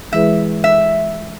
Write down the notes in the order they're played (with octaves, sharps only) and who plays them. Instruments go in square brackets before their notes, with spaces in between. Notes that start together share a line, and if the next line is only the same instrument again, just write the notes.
[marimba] E3 G#3 E4 G#4 B4 [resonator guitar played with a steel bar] E5
[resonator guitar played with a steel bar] E5